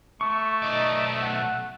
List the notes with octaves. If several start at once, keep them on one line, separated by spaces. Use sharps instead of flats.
A3 C#6
B1 D#4 D5 D#5
F#5